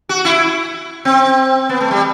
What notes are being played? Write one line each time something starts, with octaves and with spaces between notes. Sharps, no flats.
F#4
E4
C4
B3
A3
G3